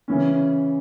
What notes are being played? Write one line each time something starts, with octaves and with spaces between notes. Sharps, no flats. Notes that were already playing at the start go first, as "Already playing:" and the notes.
C#3 E3 C#4